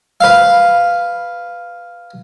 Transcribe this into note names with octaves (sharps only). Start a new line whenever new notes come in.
B4 F5